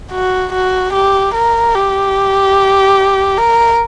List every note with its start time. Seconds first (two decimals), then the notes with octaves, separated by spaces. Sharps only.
0.12 F#4
0.53 F#4
0.93 G4
1.34 A#4
1.75 G4
3.38 A#4